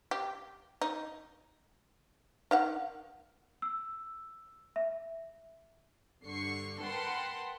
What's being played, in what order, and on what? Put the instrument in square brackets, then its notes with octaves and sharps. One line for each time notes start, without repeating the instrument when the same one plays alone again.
[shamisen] G4
D#4
D#3 F5 F#5
[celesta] E6
E5
[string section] G2 D3 C#6 C7
A#4 B4 F#5 G5 A5 C6